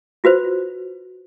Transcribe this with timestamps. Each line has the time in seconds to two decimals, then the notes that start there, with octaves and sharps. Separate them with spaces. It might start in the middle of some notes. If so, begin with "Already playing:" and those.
0.24 F4 F#4 B4 C5